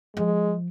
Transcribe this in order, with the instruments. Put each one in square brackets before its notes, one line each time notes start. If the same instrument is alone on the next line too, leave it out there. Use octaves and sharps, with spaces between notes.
[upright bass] F3 [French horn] G#3